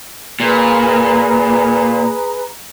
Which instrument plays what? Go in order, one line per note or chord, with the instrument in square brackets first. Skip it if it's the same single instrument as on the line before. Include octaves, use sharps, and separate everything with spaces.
[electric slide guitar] A#2 [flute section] G#4 B4 A#5